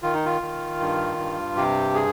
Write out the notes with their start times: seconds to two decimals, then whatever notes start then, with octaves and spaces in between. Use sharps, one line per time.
0.03 D#3 F4
0.14 D#4
0.26 F4
0.42 D#3
0.80 G2
1.18 G2
1.56 C3 G4
1.95 G#4